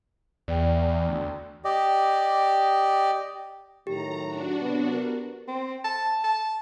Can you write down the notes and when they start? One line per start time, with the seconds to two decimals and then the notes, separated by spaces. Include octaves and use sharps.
0.48 E2 D5 G5
0.88 E2
1.08 D2
1.65 G4 D5 D#5
3.87 A2 D#3 F#3 G4 A#5
4.27 D4 F#4
4.59 C3 F#3 B3
4.92 B3 A#4
5.48 C4
5.85 A5
6.24 A5